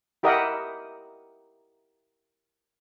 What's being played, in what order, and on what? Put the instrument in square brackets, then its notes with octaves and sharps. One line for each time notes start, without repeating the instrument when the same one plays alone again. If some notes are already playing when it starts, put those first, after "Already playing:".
[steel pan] E4 G4 A#4 D#5 E5 F#5